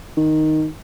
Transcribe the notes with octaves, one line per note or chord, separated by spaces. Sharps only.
D#3